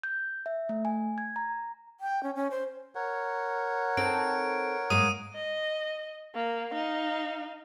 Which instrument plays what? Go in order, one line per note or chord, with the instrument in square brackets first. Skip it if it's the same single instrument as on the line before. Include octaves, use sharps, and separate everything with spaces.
[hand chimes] G6
E5
A3
G#5
G#6
A#5
[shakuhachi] G5
C#4
C#4
C5
[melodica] A#4 C#5 F#5
[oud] C4 D#4 A4 [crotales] D7
[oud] G#2 G#3 A#3 [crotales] D#6 D#7
[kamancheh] D#5
A#3
D#4 F5